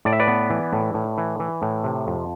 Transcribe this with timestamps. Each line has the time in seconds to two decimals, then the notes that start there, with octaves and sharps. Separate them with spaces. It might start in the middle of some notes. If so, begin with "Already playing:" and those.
0.05 A2 D5
0.13 E5
0.20 B4 D5
0.28 B3
0.50 E3
0.73 A2
0.94 A2
1.18 E3
1.40 E3
1.62 A2
1.84 C3
2.07 F2